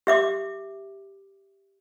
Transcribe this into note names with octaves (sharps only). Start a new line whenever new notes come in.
G4 E5 D6